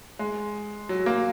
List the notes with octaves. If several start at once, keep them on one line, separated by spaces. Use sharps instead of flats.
G#3
F#3
A#3